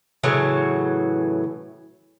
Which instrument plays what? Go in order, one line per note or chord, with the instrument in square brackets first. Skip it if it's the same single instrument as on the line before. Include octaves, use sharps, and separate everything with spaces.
[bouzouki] A2 C#3 E3 F#3